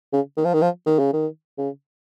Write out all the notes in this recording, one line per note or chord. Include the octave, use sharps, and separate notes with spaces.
C#3
D#3
F3
D#3
F3
D#3
C#3
D#3
C#3